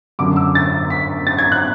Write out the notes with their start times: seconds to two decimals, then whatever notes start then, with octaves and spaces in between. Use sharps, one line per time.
0.19 F#2 D3 F#3 D6
0.36 E6
0.55 A6
0.90 B6
1.27 A6
1.38 G#6
1.52 F#6